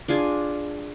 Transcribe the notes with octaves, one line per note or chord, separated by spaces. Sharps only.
D4 F4 G#4 G#5